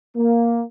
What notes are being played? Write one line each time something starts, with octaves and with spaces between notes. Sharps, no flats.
A#3